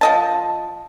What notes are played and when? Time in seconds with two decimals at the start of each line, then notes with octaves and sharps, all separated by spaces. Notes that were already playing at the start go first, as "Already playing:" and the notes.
0.01 F3 D#5 A5